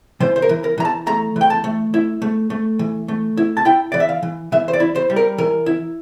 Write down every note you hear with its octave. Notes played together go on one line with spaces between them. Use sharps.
E3 C5
C5
A#4
E3
A#4
E3 A#5
A5
A3 A#5
E3
G5
A5
A3
E4
A3
A3
E3
A3
E4
A5
E4 G5
E3 D5
E5
F5
E3
E3 E5
C5
D5
E4
C5
G3
A#4
E3 A#4
E4